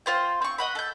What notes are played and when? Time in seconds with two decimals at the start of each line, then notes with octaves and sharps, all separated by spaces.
0.06 F4 C5 G5
0.42 C4 C#6
0.58 D#5 F#5 B5
0.75 A4 G6